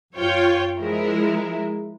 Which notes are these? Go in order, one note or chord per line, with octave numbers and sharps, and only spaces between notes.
F#2 F4 C#5 G5
F3 G#3 E4 A#4